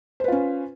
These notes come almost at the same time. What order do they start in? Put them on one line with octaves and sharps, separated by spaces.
C5 B4 F4 C#4